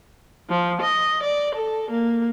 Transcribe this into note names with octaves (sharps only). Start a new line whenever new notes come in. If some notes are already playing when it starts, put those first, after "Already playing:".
F3
D#5
D5
A4
A#3